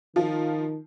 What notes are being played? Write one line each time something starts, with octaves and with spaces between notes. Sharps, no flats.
D#3 F3 F4